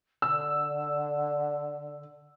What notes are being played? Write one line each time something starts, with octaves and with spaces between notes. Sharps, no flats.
D3 E6